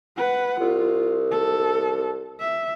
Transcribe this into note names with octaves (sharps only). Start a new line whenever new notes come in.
B4 F#5
C2 F4
A4
E5